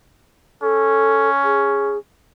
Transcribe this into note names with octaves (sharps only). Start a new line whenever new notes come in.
C#4 A4
G#4